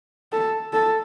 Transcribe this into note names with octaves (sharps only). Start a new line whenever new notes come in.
A4
A4